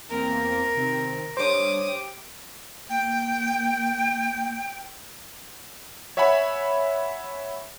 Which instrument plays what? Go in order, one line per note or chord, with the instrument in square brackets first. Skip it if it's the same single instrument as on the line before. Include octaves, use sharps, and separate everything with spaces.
[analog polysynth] E2 A#3 C4 [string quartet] A#4
[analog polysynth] C3 D#3 C4
[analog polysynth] G3 D4 [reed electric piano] C5 C#5 [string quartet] D6 D#6
[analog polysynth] G4
[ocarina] A#3 [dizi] G5
[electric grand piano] C#5 E5 F#5 G#5 B5